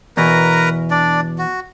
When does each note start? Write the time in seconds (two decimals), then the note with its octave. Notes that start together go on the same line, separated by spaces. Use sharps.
0.17 E2 B2 A#4 B4 A#5
0.91 D4 D5
1.38 F#4